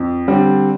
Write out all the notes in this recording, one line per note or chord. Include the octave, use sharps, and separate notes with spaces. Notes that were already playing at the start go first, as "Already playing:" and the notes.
Already playing: F2
D3 G3 C4